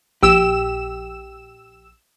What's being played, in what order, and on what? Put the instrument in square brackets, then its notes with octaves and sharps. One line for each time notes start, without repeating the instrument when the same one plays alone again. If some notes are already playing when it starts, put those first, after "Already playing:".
[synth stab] A#1 E6 E7 [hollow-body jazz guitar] G4